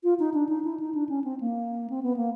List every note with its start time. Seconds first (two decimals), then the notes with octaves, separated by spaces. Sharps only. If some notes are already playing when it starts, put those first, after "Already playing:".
0.04 F4
0.19 D#4
0.34 D4
0.49 D#4
0.65 E4
0.80 D#4
0.95 D4
1.09 C#4
1.24 C4
1.40 A#3
1.90 C4
2.03 B3
2.17 A#3